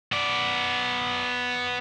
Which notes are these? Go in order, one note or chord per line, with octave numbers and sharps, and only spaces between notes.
B3 D5